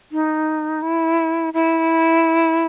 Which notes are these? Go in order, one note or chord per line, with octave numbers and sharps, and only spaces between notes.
D#4
E4
E4